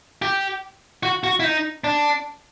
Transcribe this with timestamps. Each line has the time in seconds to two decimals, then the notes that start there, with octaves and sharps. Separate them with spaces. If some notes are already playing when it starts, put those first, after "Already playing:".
0.22 G4
1.03 F#4
1.24 F#4
1.40 E4
1.44 D#4
1.84 D4